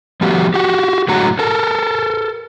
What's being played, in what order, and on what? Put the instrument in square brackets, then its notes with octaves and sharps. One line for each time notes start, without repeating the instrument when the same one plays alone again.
[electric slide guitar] F3 A3 B3 F#4 G4
F#4 G4
A2 D3 F#3 G#3 F#4 A#5
A4 A#4